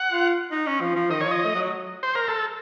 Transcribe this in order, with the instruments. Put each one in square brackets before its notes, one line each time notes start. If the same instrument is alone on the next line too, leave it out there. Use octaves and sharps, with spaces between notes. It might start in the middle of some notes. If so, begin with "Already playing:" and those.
Already playing: [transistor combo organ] F#5
[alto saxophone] F4
D#4
C#4
F3
F3
[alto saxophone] D#3 [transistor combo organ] D#5
[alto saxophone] F3 [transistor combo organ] C#5
[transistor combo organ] D#5
[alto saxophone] A3
F#3
[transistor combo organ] C5
A#4
A4